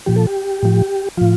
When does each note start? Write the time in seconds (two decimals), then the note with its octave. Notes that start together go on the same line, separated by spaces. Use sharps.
0.06 A#2 F3 G4
0.16 A4
0.27 G4
0.63 A2 F3
1.17 A2 F3 F4